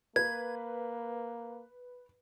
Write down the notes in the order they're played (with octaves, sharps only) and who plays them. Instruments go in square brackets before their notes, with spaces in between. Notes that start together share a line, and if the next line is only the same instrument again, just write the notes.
[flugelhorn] A#3 [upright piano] B4 [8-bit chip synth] G#6